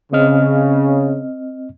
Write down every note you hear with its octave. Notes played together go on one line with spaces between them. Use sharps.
C#3 C4 D#5 F6